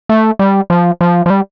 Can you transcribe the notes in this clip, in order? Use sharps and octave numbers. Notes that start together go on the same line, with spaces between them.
A3
G3
F3
F3
F3
G3